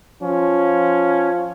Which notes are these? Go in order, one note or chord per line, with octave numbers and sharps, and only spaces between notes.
F3 C#4